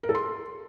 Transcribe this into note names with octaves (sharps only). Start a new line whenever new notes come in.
A#4
A4
C6